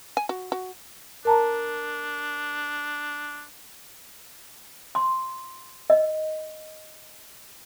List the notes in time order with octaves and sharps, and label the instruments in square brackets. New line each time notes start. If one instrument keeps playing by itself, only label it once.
[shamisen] G#5
F#4
F#4
[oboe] D4 [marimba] A#4 A5 A#5
[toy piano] C6
D#5